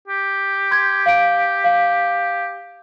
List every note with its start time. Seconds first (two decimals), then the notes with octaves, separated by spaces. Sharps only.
0.08 G4
0.71 C6 G6 G#6
1.06 F5 D7
1.64 F5